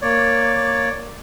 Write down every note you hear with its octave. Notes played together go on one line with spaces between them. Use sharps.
A#3 C#5 D5